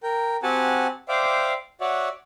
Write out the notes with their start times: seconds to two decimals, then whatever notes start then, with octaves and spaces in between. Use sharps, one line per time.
0.03 A#4 G5
0.43 C4 F#4 G4 F#5 G#5 A5
1.08 C5 D5 E5 F5 G5 D6
1.81 F#4 C#5 D5 E5 F#5